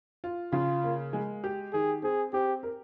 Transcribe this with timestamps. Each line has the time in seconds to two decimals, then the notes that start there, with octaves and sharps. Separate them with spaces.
0.24 F4
0.52 C#3 F4
0.84 A#3
1.13 G#3
1.44 G4
1.73 D#3 G#4
2.03 C4 G#4
2.33 C4 G4
2.63 A#4